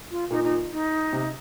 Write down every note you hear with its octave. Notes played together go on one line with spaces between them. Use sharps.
F4
A#2 D#4
D#4
D#4
C3